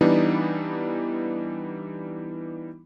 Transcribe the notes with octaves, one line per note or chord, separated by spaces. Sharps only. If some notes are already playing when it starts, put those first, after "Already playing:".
E3 G3 B3 D4 D#4